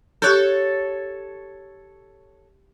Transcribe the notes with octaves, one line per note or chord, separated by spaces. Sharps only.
G4 A4 C#5 F#6 G6